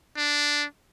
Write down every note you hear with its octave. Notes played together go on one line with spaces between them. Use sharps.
D4